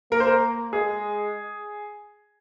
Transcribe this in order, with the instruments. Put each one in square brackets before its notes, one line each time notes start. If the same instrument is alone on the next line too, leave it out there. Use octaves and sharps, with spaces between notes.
[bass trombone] A#3 [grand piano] A#4
[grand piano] C5
A#4
[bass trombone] G#3 [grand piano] G#4